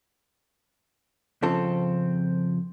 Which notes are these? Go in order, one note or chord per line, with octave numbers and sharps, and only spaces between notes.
F2 C#3 C4 F4 A4